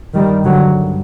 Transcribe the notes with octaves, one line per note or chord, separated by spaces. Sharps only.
G2 D#3 G3
D3 F#3